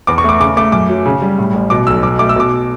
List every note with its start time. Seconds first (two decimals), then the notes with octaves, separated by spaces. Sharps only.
0.07 E2 D6
0.18 C#6
0.24 A3 D6
0.40 C#3 D6
0.57 A3 D6
0.72 F#2 D6
0.89 F#3
1.06 C#3
1.22 G3
1.39 A2
1.54 A1
1.70 B2 D6
1.87 B1 E6
2.03 B2 D6
2.19 A3 D6
2.29 E6
2.36 B2 D6